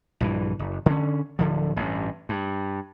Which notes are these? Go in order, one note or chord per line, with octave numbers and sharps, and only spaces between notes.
A#1 G2 E3
F#1
D3 C#4
D1 D3 F3
A1 G2
G2